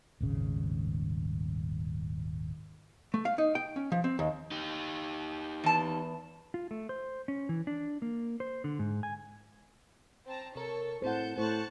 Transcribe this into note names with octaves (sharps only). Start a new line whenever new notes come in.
D#1 G#1 C#3
A3
F5
D#4
G5
C#4
F3
C4
D#2
D#4 G4
E2 A5
F4
A3
C5
C#4
E3
D4
A#3
C5
D3
G#2
G#5
C4 A5 A#5
C3 A4 A#4 C#5 C#6
A2 A3 C4 C5 F#5 A5 G6
A2 C5 A5 C#6 F#6